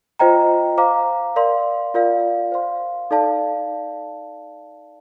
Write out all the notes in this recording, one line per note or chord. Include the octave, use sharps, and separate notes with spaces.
F4 C5 D#5 G5 A#5
C5 F5 A#5 D6
A#4 D5 F5 C6
F4 A#4 D5 F5
C5 F5 C6
D#4 A4 D5 F5 A5